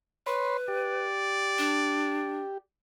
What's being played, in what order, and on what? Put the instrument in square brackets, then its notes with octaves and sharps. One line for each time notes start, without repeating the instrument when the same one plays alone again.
[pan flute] B4 [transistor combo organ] C#5 B5 C6
[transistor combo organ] G4 [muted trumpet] D5
[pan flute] D4